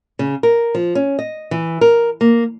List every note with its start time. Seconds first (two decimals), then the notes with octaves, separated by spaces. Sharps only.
0.19 C#3
0.43 A#4
0.75 F3
0.95 C#4
1.19 D#5
1.51 E3
1.81 A#4
2.21 A#3